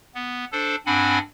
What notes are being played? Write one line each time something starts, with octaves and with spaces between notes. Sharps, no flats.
B3
D4 A4 C5
G2 C4 D4 F#5 G#5 B5